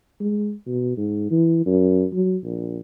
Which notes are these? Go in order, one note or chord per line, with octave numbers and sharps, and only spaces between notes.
G#3
B2
G#2
E3
F#2
F#3
A#1